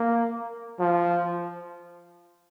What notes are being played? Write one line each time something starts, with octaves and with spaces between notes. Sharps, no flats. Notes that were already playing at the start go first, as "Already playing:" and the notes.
Already playing: A#3
F3